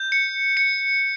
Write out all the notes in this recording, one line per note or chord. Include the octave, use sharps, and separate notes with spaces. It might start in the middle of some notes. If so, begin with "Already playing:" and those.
Already playing: G6
C#7
C#7